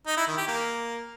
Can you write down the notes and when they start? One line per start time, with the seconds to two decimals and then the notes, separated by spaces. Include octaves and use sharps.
0.07 D#4
0.17 E4
0.27 D#3
0.37 G4
0.47 A#3